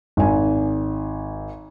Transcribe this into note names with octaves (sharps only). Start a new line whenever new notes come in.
G#1 G#5